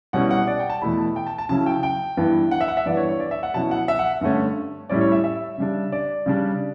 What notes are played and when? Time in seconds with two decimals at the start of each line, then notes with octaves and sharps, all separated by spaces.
0.13 B2 G3 C#4 E4 F#5
0.31 F#5
0.47 D5
0.59 G5
0.70 A5
0.82 E2 B2 A3 E4 B5
0.98 A5
1.16 G5
1.27 A5
1.38 A5
1.49 C#3 F#3 C#4 E4 A5
1.66 G5
1.83 G5
2.17 G2 E3 B3 E4
2.51 F#5
2.61 E5
2.68 F#5
2.77 E5
2.86 G2 E3 B3 D5
2.97 C#5
3.08 C#5
3.20 D5
3.31 E5
3.43 F#5
3.54 B2 F#3 C#4 E4 A5
3.71 F#5
3.88 E5
3.99 F#5
4.21 G2 D3 A3 C#4
4.90 A2 G3 C#4 E4 D5
5.01 C#5
5.12 E5
5.24 E5
5.58 C#3 G3 D4
5.92 D5
6.26 C#3 G3 D4